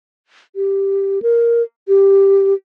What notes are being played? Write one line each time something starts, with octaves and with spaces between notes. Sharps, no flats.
G4
A#4
G4